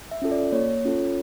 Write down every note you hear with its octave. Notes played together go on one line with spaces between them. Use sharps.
E5
C#4 F4 A4
D5
A#3 C#5
C#4 F4 A4